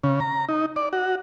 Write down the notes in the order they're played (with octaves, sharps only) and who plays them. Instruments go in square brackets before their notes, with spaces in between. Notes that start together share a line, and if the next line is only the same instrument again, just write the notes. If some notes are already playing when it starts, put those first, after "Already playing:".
[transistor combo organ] C#3
A#5
D#4
D5
F#4